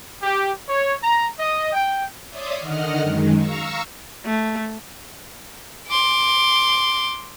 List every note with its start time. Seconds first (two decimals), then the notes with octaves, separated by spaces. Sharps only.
0.23 G4
0.69 C#5
1.03 A#5
1.39 D#5
1.73 G5
2.29 C#5 D5 E5 C6 D6 D#6
2.58 D3 D#3 D#5 F#5 F6
3.01 F#2 D#3 G#3
3.35 F5 A#5 C#6 E6
4.26 A3
5.87 C6 D6